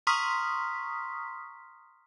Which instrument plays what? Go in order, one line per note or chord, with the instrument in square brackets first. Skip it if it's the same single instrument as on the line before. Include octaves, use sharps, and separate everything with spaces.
[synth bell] A#5 C6 C#6 D#6 F6 B6